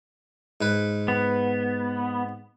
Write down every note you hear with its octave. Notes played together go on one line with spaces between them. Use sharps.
G#2 B4
B3